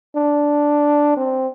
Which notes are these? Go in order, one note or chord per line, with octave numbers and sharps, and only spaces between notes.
D4
C4